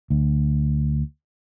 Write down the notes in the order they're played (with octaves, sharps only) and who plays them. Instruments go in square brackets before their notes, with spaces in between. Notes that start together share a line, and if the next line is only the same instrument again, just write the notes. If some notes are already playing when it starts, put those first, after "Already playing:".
[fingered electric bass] D2